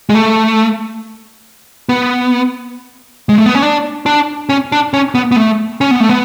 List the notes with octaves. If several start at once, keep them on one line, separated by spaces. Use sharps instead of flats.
G#3
A3
B3
G#3
A3
B3
C#4
D4
D4
C#4
D4
C#4
B3
B3
A3
C#4
B3
A3
B3